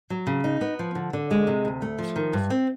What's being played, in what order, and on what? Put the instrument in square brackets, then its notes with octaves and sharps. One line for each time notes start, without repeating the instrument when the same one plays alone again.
[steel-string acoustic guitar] F#3
C#3
D#4
B3
F3
D3
D3
G#3
C3
D2
A3
F3
D#3
G2
C4